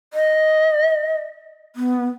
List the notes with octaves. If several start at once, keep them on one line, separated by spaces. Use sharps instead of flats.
D#5
B3